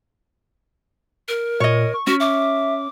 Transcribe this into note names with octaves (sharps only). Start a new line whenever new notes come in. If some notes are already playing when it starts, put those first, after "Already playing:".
A#4
A#2 C#5 D#5
C#6
C#4 F#4
E5 D6